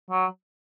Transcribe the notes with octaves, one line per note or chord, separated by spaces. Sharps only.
F#3